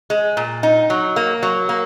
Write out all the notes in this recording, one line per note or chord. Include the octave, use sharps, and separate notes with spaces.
G#3
A#2
D#4
F#3
A#3
F#3
A#3